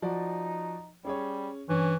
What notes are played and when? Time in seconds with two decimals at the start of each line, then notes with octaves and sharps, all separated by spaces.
0.02 F3 D#4 F#4 D5
1.05 G3 C#4 G#4 C#5
1.69 G2 E3 C#4